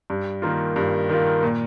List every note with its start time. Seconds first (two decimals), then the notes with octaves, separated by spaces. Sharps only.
0.10 G2
0.42 D#3 A#3 F4
0.76 G2
1.09 D#3 A#3 F4
1.43 A#2